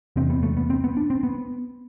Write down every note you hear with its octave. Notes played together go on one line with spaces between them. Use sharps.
E2 C3 C4
B3
A3
B3
C4
B3
D4
C4
B3